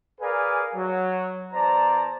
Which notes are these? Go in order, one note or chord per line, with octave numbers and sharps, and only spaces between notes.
G#4 A#4 B4 D5 F5 G#5
F#3
E2 C5 D5 A5 A#5